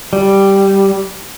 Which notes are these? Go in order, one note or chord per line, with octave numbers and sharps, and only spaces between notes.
G3